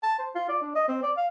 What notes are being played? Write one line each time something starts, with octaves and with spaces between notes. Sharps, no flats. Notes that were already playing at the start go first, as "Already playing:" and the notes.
A5
C5
F4
D5
D4
D#5
C4
D5
F5